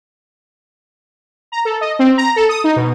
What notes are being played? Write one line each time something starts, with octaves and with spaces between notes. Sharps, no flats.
A#5
A4
D#5
C4
A#5
A4
D#6
D#4
B2